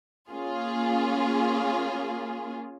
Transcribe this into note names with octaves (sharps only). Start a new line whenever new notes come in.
A#3 C#4 F4 G#4